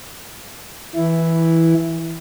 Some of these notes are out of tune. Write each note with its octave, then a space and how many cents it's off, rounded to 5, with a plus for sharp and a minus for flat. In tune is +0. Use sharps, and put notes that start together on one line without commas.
E3 -5 E4 +0